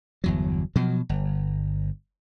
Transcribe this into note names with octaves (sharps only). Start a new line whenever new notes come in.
G1 E2 F#3
B2 F3 F#3
G1